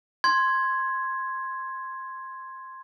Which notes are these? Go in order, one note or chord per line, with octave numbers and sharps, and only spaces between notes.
C6 G#6